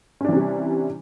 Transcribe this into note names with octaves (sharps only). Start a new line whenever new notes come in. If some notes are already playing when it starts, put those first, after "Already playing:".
C3 E3 G3 C#4 D4